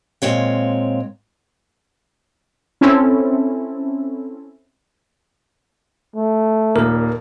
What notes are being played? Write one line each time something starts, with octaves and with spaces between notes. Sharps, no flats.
A#2 G#3 C4 C#5 F5
C4 C#4 E4 A4
A3
D#2 A#2 A#4